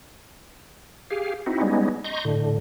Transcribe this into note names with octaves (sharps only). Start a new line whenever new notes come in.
G4 G#4 F5
C4 D#4 E4 F#4
G3 G#3 B3 C#4 D#4
D#5 A#5 C6 C#6 G6
A2 D3